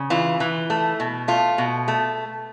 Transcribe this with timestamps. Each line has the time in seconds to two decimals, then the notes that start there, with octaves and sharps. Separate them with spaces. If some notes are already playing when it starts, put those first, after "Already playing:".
Already playing: C#3
0.10 E3 F4
0.40 E3
0.70 A3
1.00 B2
1.28 A3 F4
1.58 B2
1.88 A3